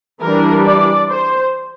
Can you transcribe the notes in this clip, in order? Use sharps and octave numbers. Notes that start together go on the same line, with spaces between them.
E3 G3 D4 A#4
D5
C5